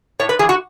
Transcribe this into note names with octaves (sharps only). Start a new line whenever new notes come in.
A2 C#5
B4
E3 G#4
F#4